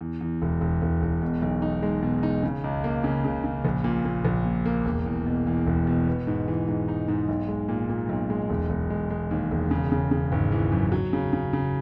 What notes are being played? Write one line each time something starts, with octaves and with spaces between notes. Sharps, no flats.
E2
E2
E1
E1
E1
E1
B2
B1
D#4
G#3
B2
D#4
C#3
C#2
A#3
C#3
C#3
C#3
A#1
A#2
A#2
A#1
A#2
A#3
E1
E2
B2
E2
E1
B2
B3
G#2
E3
G#2
D#4
G#2
B1
G#3
A#2
A#2
B1
G#3
E1
E1
G#3
G#3
D#2
E1
C#3
C#3
C#3
G#1
E3
F#2
F#3
C#3
C#3
C#3